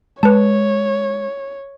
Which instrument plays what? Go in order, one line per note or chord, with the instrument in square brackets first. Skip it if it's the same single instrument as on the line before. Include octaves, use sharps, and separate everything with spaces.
[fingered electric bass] G#3 [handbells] B4 A5 [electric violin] C#5